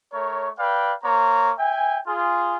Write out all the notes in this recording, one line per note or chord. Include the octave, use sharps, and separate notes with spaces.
A3 A#4 C#5
B4 D5 F5 G5
A#3 C5 C#5 A#5
E5 G5 G#5
F4 G#4